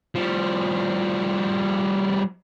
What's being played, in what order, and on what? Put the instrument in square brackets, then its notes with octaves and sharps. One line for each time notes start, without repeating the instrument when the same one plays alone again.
[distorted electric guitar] F3 G3